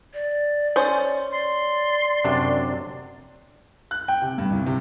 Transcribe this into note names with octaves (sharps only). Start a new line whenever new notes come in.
D5
C#4 C5
D5 C6
F#2 C3 D4
F#6
G5
C3
G2
C2
C3